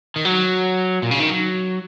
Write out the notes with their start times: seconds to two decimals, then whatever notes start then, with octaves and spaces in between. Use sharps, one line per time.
0.16 D#3
0.25 F#3
1.02 A#2
1.11 C#3
1.20 D#3
1.29 F#3